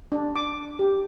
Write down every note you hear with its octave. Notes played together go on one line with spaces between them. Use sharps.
D4
D6
G4